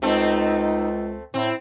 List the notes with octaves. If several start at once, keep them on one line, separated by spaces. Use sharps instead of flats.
C#2 A3 C4 D#4 A4
A2 C4 E4